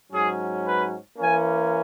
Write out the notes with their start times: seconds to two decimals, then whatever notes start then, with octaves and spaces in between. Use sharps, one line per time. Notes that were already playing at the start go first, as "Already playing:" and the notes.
0.09 G#2 F#3 C#4 G#4
0.63 B4
1.17 E3 A#3 C#4 G#5